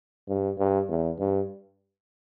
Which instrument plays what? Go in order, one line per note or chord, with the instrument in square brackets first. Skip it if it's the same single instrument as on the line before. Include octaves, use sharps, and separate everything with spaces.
[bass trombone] G2
G2
E2
G2